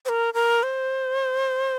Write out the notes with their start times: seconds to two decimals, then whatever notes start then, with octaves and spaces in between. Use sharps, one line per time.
0.05 C5
0.09 A#4
0.34 A#4
0.63 C5